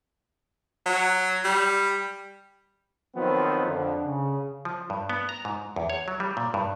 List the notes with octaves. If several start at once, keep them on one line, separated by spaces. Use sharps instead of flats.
F#3
G3
D#3 F3 F#3 B3 C4
F2 D3
C#3
F3
G2
B3
A#5
G#2
E2
C#5
F#3
G3
A#2
G2